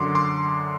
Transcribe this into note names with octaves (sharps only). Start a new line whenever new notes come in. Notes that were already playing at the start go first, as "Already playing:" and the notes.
Already playing: F#2 D3 F#3 C6 D6
C6 D6